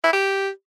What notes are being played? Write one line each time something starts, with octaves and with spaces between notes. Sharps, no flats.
E4
G4